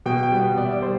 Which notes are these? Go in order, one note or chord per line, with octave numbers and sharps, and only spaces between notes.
B2 G5
G5
G3 B3
F#5
B2 D5
E5
D5
G3 C5